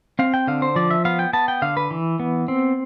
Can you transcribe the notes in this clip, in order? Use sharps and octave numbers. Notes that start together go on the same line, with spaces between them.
C4 F5
G5
D3 F5
C5
F3 D5
E5
B3 F5
G5
B3 A5
G5
D3 F5
B4
E3
B3
C4